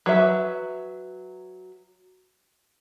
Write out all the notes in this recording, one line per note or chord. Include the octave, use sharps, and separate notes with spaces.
F#3 B4 E5